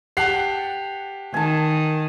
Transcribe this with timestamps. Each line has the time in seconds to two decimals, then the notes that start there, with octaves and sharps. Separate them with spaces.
0.17 G4 F#5 A5 C7
1.34 D#3 G#5 A5